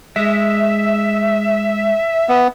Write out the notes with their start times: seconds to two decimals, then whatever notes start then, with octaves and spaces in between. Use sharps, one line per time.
0.16 G#3 E5
2.29 B3